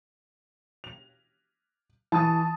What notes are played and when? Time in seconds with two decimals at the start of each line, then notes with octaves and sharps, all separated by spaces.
0.84 F7
2.12 E3 A5 D#6